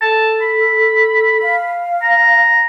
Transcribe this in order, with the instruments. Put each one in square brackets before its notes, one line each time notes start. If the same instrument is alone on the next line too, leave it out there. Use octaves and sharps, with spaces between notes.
[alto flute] A4 [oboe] A5
[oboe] B5
[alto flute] F5
[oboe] A#5